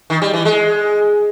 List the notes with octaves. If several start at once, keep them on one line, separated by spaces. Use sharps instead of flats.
D#3
G3
E3
G#3